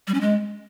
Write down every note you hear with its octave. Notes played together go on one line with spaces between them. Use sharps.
G3
C#4
G#3